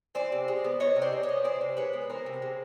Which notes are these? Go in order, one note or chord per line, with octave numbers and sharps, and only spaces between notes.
E3 C5 D5
C3
G#3
B3
E3 C#5 D#5
C3
C5 D5
G#3
C#5 D#5
B3
E3 C5 D5
C3
G#3 B4 C#5
B3
E3 A#4 C5
C3
G#3